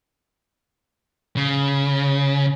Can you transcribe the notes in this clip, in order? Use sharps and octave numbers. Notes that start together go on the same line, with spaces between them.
C#3